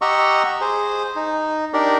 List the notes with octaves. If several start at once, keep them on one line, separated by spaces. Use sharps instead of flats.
G4 D#5 F#5 A#5 C#6 E6
G#4 C5
D#4
D4 D#4 G4 A#4 D5